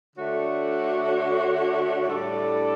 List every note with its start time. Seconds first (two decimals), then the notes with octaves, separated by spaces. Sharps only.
0.15 D3 A3 D4 F#4 C#5
2.06 A2 G3 D4 A4 D5